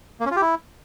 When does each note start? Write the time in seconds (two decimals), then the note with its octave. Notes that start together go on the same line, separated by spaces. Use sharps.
0.20 A#3
0.26 C#4
0.31 F4
0.36 G4
0.42 E4